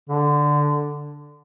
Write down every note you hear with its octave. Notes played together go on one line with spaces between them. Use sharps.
D3